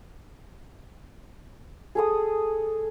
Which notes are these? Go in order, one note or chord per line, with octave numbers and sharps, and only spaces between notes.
G#4 A4 D#6